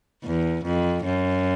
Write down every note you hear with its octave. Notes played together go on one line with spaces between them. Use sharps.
E2
F2
F#2